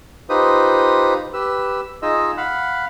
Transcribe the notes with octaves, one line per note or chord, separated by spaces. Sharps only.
D#4 F4 G4 B4 C5 D#6
G4 B4 E6
D#4 F4 G#4 D#5 E6
F5 F#5 B5